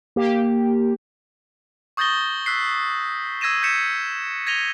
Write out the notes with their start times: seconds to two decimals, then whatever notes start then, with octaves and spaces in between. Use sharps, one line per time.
0.16 A#3 G4
1.97 C#6 D#6 G6 A6 A#6 G7
2.46 E6 F#6 B6 C7
3.41 D#6 E6 G#6 A#6 D#7 E7
3.62 E6 G6 B6 C#7 E7
4.47 G#6 A#6 D#7 F7 G7